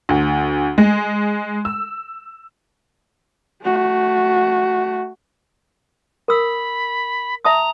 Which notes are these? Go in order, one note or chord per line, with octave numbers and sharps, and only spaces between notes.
D2
G#3
E6
A3 F#4
A#4 B5 E6
E5 A5 A#5 D#6